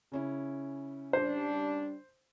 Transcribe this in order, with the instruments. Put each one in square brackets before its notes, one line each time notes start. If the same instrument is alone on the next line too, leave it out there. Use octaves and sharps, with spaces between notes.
[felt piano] C#3 C#4 E4
[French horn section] G3 D4 [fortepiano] C5